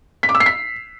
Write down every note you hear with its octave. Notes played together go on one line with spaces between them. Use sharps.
B6
D6
E6
C7
B6